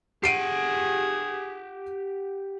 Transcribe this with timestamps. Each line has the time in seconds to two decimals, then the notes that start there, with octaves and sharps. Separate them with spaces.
0.24 G4 G#4 F#5 C7 D7 D#7